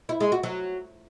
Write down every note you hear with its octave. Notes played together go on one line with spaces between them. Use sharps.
E4
G#3
F#4
F#3